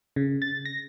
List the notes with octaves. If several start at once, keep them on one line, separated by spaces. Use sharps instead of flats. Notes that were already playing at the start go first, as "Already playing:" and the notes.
C#3
A6
A#6